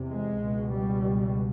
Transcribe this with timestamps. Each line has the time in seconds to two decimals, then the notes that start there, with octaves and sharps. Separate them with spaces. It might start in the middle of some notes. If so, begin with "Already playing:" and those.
Already playing: E2 C3
0.08 G#3
0.41 C#2 B2
0.73 G3